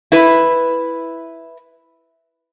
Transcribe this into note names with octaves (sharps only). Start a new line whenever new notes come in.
E4 B4